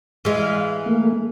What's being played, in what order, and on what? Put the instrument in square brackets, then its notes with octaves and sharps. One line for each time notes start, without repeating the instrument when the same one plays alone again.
[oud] E3 G#3 [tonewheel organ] F5
[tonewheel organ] A3 A#3